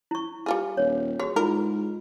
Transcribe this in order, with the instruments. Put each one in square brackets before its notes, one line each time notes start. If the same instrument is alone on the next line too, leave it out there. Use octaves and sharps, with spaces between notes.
[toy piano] E4 C#6
[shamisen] G3 F4 G#4
[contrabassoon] D#1 [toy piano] C#5
[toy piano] F#4 G#4 [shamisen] C#5
[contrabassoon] G#2 [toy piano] E4 F4 [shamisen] A#4